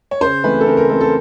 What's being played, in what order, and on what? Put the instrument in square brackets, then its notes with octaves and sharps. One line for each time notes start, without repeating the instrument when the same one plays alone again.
[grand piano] C#5
C#3 C5
E3 A3 C4 B4
A4
C#3 A#4
A#4
E3 A3 C4 A4
A4